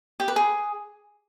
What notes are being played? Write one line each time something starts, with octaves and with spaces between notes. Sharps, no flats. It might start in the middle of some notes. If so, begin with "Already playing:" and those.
G4
B4
G#4